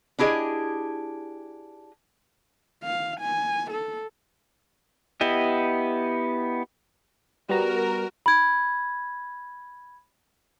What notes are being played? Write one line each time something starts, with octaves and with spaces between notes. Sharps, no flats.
D4 E4 G4 G#4 D#5
F5
G#5
A4
B3 E4 G4 D#5
G3 B3 F#4 A#4 A#5
B5 G#6